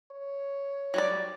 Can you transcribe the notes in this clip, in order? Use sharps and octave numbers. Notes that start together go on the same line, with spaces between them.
C#5
F#3 G3 D5